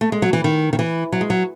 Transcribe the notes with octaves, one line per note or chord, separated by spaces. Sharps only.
A3
G#3
F#3
E3
D#3
D#3
E3
F#3
G#3
F#3